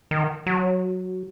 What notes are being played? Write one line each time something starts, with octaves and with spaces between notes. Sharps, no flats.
D#3
F#3